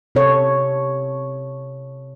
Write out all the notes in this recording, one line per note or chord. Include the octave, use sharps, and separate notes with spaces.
C3 A4 C#5